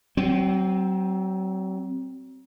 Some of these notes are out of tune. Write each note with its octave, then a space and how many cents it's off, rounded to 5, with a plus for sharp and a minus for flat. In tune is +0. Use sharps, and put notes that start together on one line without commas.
F#3 +40 C4 +5